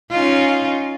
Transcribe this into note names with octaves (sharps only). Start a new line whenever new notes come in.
C#4 D#4 F4